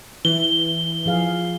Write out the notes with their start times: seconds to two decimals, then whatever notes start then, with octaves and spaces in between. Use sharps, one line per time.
0.25 E3 G7
1.06 F3 G#4 F5